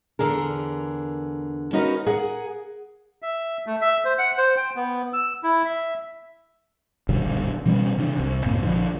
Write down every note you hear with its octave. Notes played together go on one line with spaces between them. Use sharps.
E2 D3 G#4 A#4
C#4 D#4 F#4 A#4 B4
G#4 A#4 F#5
E5
A3
E5
C5
F#5
C5
G5
B3
E6
E4
E5
D#1 B1 G2 D3
B2 E3 G3 C#4
C3 E3 D4
C2 C3
F#2 A2 C3 A#3
A#1 D3 F3